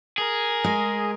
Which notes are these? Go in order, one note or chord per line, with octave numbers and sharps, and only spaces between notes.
G#4 A#4
G#3